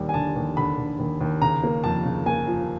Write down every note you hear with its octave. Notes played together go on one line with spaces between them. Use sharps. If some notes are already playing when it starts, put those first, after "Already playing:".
Already playing: D#2 G3
G#5
D3 A5
D#2
D3 B5
D3
D#2
D#2
C#3 A#5
A#3
F2 A5
C#3
A#3 G#5
F3